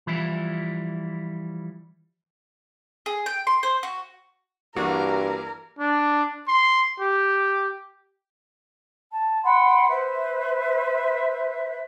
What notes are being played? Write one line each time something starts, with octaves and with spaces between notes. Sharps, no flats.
E3 F3 G3 E4
G#4
G5
C6
C5
F#4
G2 E3 A#3 F#4 A#4 D5
D4
C6
G4
A5
F#5 G5 B5 C6
B4 C5 E5